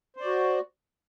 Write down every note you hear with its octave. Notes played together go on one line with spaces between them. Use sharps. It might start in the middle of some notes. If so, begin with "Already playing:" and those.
F#4 C5 D5